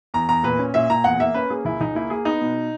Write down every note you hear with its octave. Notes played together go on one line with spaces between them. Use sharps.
E2 A#5
E2 A#5
A#2 B4
C#4
A#2 E5
A#2 A#5
E2 F#5
A#3 E5
C#4 B4
A#3 G#4
C#2 E4
C#2 D#4
A#3 E4
A#3 G#4
B3 D#4
B2